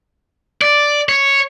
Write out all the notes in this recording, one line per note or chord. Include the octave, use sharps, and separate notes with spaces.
D5
C#5